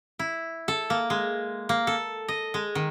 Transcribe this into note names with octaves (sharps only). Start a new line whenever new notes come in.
E4
A4
A#3
G#3
A#3
A4
D#5
G#3
D#3